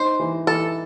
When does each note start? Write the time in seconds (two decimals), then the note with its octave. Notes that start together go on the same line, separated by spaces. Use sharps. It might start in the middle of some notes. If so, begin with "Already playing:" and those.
Already playing: D#4 C5
0.20 E3
0.47 E3 A4